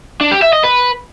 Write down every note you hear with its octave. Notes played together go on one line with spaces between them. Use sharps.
D4
G4
E5
D#5
B4